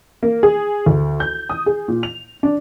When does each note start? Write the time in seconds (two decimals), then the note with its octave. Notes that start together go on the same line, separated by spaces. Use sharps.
0.23 A#3
0.43 G#4
0.86 D2
1.20 G6
1.49 D#6
1.66 G#4
1.88 A#2
2.03 F7
2.43 D4